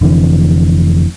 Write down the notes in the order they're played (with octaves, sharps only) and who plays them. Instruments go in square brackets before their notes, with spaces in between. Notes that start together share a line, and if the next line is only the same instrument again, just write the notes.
[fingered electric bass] F1 D3 E3 C4